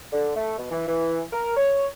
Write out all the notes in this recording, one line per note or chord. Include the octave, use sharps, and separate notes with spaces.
D3
A3
B2
E3
E3
A#4
C#5